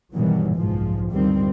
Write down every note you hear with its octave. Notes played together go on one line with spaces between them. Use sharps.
G2 B2 D#3 E3 F#3 G3
F#1 B1 G#2 F3 G#3
D2 G2 D#3 F3 G3 C4